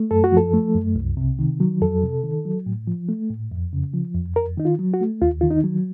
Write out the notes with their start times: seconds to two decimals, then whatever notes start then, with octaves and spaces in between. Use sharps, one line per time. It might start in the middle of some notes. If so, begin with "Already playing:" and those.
Already playing: A3
0.11 F#2 A4
0.24 F#4
0.32 F3 A4
0.54 A3
0.75 F#2
0.96 C2
1.17 C3
1.39 D#3
1.60 F#3
1.82 F2 A4
2.03 C3
2.24 D#3
2.45 F#3
2.66 A2
2.87 F3
3.09 A3
3.30 A2
3.52 F2
3.73 C#3
3.94 F3
4.15 F2
4.36 F2 A#4
4.58 D#3 D#4
4.65 F4
4.79 F#3
4.94 F#4
5.01 A3
5.22 D#2 F4
5.41 D#3 F4
5.51 D#4
5.64 F#3